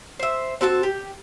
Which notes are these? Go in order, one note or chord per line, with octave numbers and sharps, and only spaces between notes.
C5 E5
C4 F#4 A4 A5
G4